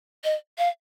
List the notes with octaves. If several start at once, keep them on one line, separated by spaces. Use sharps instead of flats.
D#5
F5